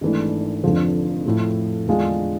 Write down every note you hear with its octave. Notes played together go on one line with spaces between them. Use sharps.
G#1 G#2 E3 A3 D4
F1 F2 D3 F3
A2 F3 A3
E2 D3 G#3 D4 F4